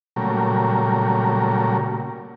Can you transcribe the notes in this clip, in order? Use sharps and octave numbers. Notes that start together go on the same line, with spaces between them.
A#2 C#3 F#3 G3 A3 A#4